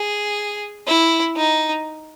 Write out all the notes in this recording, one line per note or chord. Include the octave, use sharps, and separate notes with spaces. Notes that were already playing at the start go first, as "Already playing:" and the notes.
Already playing: G#4
E4
D#4